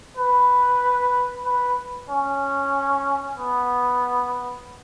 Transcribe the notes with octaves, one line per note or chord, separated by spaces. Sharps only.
B4
B4
C#4
B3